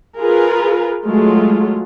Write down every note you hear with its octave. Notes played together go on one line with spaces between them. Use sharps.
F4 G#4 A#4 B4
F#3 G#3 A3 F4